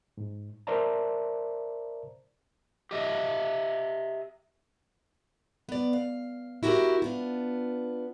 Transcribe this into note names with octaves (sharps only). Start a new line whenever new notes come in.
G#2
A#4 C5 D5 E5 A5 A#5
G4 D#5 E5
B3 D5
F5
E4 F#4 G4 A#4
B3 D4 F4